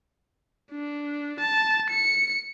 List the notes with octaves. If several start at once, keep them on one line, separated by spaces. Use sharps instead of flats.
D4
A5
C#7